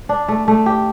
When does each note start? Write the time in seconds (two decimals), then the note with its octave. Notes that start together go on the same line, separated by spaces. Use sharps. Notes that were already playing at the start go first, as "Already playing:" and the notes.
0.09 D4
0.28 A3
0.48 A3
0.66 G4